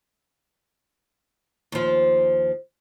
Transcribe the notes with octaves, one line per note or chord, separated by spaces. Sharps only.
D#2 F3